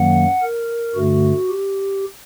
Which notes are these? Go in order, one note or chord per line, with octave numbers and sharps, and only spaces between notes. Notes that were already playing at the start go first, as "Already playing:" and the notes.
Already playing: F#2 D#3 F#3 A#3 F#5
A#4
G2 D3 A3 F#4
G4